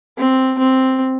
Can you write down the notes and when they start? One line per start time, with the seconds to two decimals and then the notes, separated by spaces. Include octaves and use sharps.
0.18 C4
0.58 C4